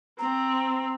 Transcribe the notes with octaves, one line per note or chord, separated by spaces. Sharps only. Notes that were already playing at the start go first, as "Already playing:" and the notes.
C4 A#5